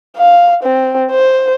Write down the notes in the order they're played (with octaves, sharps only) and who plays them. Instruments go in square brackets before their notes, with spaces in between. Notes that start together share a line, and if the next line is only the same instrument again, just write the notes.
[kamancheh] F5
C4
C5